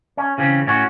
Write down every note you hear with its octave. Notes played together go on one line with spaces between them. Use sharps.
C#4
C#3 E3 C4 C#4
A2 C#4 F#4